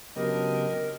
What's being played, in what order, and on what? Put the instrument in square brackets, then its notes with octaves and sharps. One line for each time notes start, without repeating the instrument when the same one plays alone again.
[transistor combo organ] C#3 B3 G4 [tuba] F#3 [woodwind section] D4 D#5 [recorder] A#4